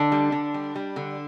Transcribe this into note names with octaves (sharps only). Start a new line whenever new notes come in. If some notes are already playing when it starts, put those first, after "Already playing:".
Already playing: D3 D4
G3
D3
G3
G3
D3